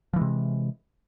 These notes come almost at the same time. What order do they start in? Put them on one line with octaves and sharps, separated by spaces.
F3 E3 G#3 C3